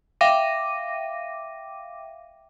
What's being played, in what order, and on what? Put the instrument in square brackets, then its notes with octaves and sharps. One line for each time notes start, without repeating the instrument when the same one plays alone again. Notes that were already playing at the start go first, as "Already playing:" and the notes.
[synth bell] E5 F5 G5 D6 A#6 D#7